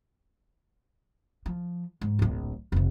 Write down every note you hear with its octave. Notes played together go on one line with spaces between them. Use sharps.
F3
G#2
D1 A#1
F1 C3